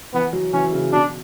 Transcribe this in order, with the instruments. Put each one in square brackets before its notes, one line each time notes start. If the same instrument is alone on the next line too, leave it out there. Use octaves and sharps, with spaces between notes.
[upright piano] E3 [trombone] B3
[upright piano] F#3
[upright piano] E3 [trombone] C#4
[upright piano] C#3
[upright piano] B2 [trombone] D4